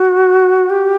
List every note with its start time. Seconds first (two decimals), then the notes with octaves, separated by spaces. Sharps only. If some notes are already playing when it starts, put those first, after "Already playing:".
Already playing: F#4
0.70 G4